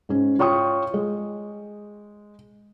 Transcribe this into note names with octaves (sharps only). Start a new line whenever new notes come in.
G#2 C#4
F4 C#5 G5 C#6 D#6
G#3